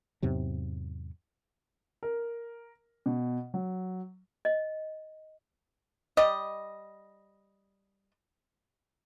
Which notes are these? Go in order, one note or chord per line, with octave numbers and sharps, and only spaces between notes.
E2 G#2 C3 F#3
A#4
B2
F#3
D#5
G3 D#5